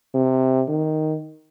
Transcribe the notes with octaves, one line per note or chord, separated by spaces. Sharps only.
C3
D#3